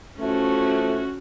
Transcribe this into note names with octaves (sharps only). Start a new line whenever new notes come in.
E3 F3 A3 C#4 F#4